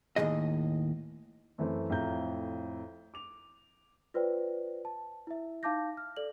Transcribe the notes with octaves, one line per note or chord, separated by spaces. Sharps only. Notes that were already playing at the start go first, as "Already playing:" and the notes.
D#2 A2 C#3 G#4 D#5
F#2 E3 A3 C4
F2 A2 E4 F5 A#5 G6
D6 F7
F4 B4 C5 D5 G5
A5
E4 E5
D#4 F5 A5 D6 G6 A#6
F6
A4 D5 F#7